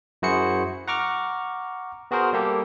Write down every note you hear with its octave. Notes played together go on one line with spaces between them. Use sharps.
F#2 E4 F#4 G#4 C5 C#7
F#5 A#5 C#6 D6 F6
B3 F#4 G#4 A#4 C5
G3 A#3 G4 A4